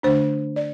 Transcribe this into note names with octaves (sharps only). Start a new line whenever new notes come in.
D3 A3 D4 C5
D5